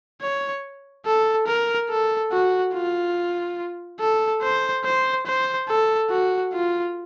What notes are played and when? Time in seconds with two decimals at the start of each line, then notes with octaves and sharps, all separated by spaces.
0.21 C#5
1.06 A4
1.47 A#4
1.89 A4
2.32 F#4
2.74 F4
4.00 A4
4.42 C5
4.85 C5
5.26 C5
5.68 A4
6.10 F#4
6.53 F4